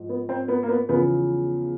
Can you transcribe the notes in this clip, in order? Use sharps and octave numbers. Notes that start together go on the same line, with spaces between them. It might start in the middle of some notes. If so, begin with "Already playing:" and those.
Already playing: G#2 F3
B3
C4
B3
A#3
B3
E2 C#3 F3 B3